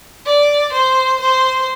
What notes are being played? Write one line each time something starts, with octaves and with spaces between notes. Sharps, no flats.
D5
C5
C5